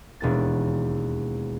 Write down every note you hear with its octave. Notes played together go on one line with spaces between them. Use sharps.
E1 D#2 A6